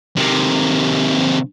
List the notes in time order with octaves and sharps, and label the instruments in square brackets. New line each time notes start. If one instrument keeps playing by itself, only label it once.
[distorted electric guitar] C3 D#3